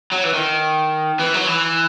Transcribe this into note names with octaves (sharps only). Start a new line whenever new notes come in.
F#3
E3
D#3
E3
F#3
E3